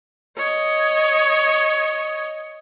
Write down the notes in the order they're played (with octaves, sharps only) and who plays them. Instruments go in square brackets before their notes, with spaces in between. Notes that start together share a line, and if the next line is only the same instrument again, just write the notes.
[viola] C#5 D#5